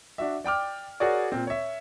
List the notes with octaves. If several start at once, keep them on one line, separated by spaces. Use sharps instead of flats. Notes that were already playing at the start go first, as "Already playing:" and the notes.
D4 F#4 E5
D5 G5 D6 F6
F#4 G#4 A#4 C#5 D5
A#2 C4
C#5 E5